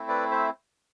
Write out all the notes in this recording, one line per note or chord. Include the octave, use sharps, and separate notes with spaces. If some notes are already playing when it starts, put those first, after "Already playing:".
Already playing: A3 C4 E4
B4 D5
C5 E5